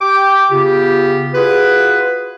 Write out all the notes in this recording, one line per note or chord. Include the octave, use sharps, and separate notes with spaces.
G4 G5 D6
C#3 B3 F4 G4
F4 F#4 G#4 B4